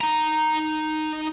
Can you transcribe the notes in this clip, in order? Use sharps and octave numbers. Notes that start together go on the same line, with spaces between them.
D#4 A#5